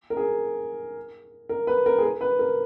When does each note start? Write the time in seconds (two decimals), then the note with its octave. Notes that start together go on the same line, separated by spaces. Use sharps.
0.10 A#4
0.17 G#4
1.49 A#4
1.67 B4
1.86 A#4
1.98 G#4
2.03 A#4
2.21 B4
2.39 A#4